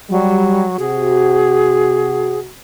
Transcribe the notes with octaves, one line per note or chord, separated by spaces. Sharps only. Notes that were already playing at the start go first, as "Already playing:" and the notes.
F#3 G3
C3 F#4 G#4